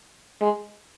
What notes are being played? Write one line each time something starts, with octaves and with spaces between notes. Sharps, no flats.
G#3